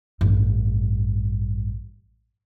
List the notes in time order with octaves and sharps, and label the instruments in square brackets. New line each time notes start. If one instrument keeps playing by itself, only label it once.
[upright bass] A1 G2